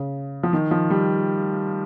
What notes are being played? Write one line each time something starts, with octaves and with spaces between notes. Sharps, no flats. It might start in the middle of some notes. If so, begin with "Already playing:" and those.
Already playing: C#3
F3
D#3
F3
G3